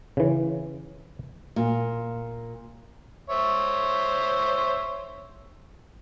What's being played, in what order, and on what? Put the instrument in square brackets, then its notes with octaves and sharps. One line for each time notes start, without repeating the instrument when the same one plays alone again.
[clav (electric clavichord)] C#3 E3
[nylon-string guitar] A#2
[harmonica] C5 C#5 E5